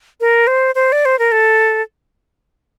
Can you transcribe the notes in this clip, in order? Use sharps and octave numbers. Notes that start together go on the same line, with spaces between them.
A#4
C5
C5
D5
C5
A#4
A4